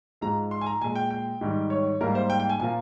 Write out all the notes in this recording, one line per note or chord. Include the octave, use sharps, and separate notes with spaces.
G#2 F3 G#3 A#5
C6
G#5
A#5
A#2 G#3 G#5
G5
G5
G#2 D#3 G3
C#5
G#2 G3 A#3 A#4
C5
G5
G5
G#5
A#2 F3 A#3 G#5